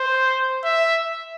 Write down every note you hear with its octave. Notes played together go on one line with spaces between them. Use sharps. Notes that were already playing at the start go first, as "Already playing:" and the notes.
Already playing: C5
E5